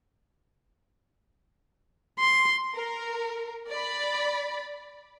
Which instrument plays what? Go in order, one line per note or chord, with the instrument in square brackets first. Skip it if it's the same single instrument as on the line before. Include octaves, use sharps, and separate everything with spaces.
[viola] C6
[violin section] A#4
D5 B5